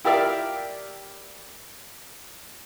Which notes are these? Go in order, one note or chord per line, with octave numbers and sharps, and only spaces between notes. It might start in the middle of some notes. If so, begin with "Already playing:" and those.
E4 G4 A#4 D5 E5 F5